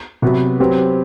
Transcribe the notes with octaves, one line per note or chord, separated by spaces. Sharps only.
C3 F#3 B3 F#4 B4
F#3 C4 G4 B4